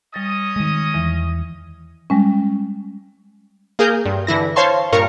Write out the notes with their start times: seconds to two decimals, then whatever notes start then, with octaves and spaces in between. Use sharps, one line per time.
0.14 G3 C#4 D#5 D#6 A6
0.56 D#3 G#3
0.94 E2 E3
2.10 G3 G#3 C#4
3.79 A#3 G#4 A#4 G6
4.05 G2
4.27 D3 E3 E4 A#6
4.56 C5 C#5 F5 A5 C6 C#6
4.92 G2 A#2 F4 A#4 C#6 C#7